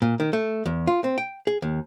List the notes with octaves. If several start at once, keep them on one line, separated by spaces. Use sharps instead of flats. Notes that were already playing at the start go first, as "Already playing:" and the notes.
A#2
D#3
A3
E2
F4
C4
G5
G#4
D#2